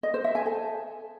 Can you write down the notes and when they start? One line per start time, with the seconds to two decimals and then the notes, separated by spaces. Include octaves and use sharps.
0.03 D#5
0.14 C5
0.24 E5
0.35 G#5
0.46 A4